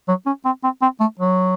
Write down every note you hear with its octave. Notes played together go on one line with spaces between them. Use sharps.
F#3
C#4
C4
C4
C4
A3
F#3